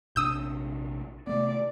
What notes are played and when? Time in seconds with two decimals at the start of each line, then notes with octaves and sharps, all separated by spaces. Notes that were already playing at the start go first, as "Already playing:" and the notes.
0.16 A#1 C3 D4 D#6 E6 G6
1.27 C3 A3 B3 D5